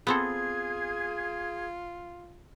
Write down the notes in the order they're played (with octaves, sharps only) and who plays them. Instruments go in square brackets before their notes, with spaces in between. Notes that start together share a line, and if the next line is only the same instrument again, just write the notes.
[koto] B3 C4 A4 [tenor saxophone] F4 [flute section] G#4 G#6